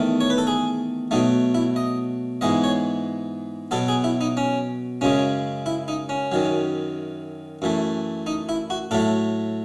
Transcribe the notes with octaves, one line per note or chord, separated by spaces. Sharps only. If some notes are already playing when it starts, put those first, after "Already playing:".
Already playing: E2 D#3 A3
C#5
B4
A4
G#4
B2 F#3 A3 D#4
E4
D#5
G#2 E3 G#3 B3 D#5
C#5
B2 F#3 B3 A4
G#4
E4
D#4
C#4
F#2 C#3 G#3 C#4
E4
D#4
C#4
F#2 D#3 F#3
F#2 E3 A3
D#4
E4
F#4
A2 F#3 A3 A4